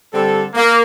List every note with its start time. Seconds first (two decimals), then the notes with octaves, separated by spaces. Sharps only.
0.12 D3 G3 C4 A4
0.54 A#3